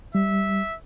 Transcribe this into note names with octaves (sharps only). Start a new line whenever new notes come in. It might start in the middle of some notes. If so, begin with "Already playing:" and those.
G3 E5